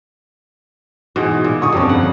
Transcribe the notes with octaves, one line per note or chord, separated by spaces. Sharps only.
G#2 B2 E3 G#4
A#2
D3 C#6 D#6
G1 F2 C#3 G3
F#5